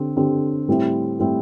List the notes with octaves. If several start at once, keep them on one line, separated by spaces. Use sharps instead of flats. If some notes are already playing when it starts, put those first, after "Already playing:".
Already playing: D3 C4 G4
D3 C4 G4
A2 G3 C4 E4
A2 G3 C4 E4